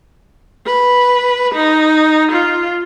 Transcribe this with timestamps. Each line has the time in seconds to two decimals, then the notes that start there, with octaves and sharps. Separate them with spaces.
0.66 B4
1.54 D#4
2.31 F4